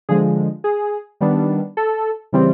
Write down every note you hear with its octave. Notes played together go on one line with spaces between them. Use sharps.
D3 F3 G#3 G#4
G#4
D#3 G3 B3 D4
A4
C#3 E3 G3 C4